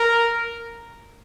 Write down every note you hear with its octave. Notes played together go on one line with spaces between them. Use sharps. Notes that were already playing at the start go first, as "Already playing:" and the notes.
Already playing: A#4